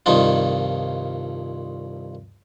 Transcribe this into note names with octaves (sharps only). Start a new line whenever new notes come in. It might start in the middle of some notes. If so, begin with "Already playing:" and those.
C2 G2 D#3 F3 D#4 F4